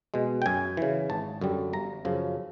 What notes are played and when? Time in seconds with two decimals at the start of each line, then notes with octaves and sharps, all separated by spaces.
0.14 B2 G#3
0.42 G5
0.46 F#2 G#5
0.77 C#3 E3
1.10 G#1 A5
1.41 F#2 D3 G3
1.73 G1 A#5
2.05 F#2 C#3 F3